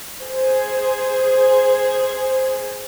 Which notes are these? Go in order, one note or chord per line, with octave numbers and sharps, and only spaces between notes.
G#4 C5